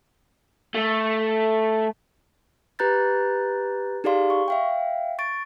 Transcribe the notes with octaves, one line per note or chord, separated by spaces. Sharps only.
A3
G4 B4 A#5 F#6 G6 A6
D#4 G4 G#4 D5 F5 C6
C#6
E5 F5 G5
C#6 A6 D7